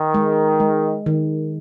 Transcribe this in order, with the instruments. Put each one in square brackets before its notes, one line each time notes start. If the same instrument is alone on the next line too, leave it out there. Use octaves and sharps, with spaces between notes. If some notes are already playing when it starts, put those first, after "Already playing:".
Already playing: [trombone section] D#3
[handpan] G#3
G#3
D#3